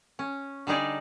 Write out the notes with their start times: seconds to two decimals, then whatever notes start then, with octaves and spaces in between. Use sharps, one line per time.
0.19 C#4
0.67 D3 G3 D#4 G#4 D5